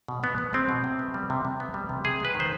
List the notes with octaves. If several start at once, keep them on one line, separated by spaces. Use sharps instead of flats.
B2
B2 B3
B3
G#3 C4
B2
C3
B3
G3
C3
C3
B3
G3
C3
C3 G#4
G#3 B4
D#3
C5